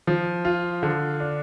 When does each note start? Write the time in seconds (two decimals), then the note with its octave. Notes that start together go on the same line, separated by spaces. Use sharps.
0.07 F3
0.45 F4
0.83 D3
1.20 D4